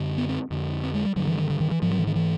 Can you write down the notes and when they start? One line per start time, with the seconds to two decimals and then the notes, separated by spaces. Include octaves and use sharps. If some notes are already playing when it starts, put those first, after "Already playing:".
Already playing: F#2 D3
0.18 B3
0.29 C4
0.51 F2 D3
0.84 C4
0.95 G#3
1.05 G3
1.16 G2 D3 F#3
1.27 E3
1.38 D#3
1.50 D3
1.60 D#3
1.71 E3
1.82 G#2 F3
1.91 F#3
1.99 E3
2.07 D#3
2.16 E3